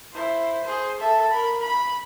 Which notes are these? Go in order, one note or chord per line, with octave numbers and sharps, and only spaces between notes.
E4 C5
G#4 C5
A4 E5
A#4 B5
B5